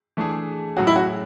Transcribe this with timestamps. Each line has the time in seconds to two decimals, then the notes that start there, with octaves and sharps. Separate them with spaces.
0.17 E3 A3 D4 G#4
0.77 A2 F#3 C#4 F#4 G#4
0.87 E4
0.96 F#4